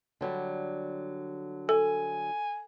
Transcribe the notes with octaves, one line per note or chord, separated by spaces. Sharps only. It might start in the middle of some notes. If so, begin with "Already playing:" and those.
D3 F#3 G3
A4 G#5